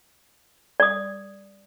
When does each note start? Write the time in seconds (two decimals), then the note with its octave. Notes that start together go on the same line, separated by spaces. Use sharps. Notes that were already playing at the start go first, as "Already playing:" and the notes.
0.80 D5 D#6